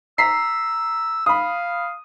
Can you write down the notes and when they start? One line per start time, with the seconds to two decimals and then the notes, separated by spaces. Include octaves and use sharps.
0.18 A#5 E6 B6 C7
1.26 F5 B5 D#6